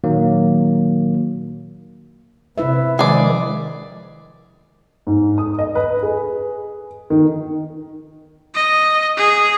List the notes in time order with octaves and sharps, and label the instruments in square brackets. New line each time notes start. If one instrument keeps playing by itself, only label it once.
[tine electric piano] A#2 D#3 F#3 A#3
[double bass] C3 [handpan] E4 B4 E5
[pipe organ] D#3 F3 G#3 [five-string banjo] G#4 D5
[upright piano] G#2
D#6
D#5
B4
G#4
D#3
[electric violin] D#5
G#4